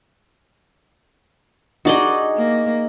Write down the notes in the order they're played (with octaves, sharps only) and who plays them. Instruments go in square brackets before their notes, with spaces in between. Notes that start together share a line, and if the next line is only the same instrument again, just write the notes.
[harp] D#4 G#4 [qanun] F#4 D5 D#5
[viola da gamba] A#3